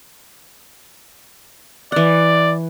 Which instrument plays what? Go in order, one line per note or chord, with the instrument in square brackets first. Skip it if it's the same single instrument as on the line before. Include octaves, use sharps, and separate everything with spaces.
[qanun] E3 F#5 [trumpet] D5